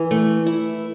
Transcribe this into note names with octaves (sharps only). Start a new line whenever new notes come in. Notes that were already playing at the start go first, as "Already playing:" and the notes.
Already playing: E3
A3
E4